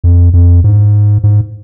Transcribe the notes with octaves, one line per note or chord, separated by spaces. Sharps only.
F2
F2
G#2
G#2